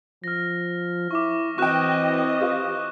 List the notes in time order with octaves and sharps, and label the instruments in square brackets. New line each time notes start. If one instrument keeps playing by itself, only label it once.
[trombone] F3 [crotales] F6 A#6
[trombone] E4 [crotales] C#6 D6
[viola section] E3 D#5 [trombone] C4 [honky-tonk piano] F#4 G5 [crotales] C#6 F#6 E7
[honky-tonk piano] F4 G4